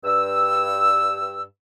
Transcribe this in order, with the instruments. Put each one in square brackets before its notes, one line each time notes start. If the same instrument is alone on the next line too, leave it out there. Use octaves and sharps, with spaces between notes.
[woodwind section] G2 E6